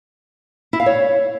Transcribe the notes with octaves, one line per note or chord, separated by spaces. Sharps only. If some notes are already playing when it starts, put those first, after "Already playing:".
E4
F5
C#5